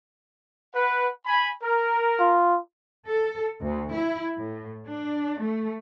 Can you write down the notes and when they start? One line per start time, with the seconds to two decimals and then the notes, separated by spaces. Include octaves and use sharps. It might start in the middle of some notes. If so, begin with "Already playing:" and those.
0.74 B4 F#5
1.25 G#5 B5
1.63 A#4
2.20 F4
3.07 A4
3.61 D2
3.94 E4
4.36 A2
4.85 D4
5.40 A3